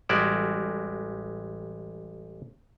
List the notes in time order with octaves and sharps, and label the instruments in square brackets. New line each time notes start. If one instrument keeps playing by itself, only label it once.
[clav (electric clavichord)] A1 G3 G#3 E4 F#4 D5